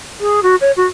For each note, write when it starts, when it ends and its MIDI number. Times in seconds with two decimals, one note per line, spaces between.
0.20 0.40 68
0.43 0.55 66
0.61 0.71 73
0.76 0.86 66